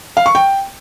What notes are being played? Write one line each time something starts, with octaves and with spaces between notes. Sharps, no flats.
F5
C#6
G5